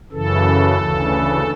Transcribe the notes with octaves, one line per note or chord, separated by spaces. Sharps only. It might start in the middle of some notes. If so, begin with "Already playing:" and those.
F#2 C#3 E3 A4
D2 C#3 E3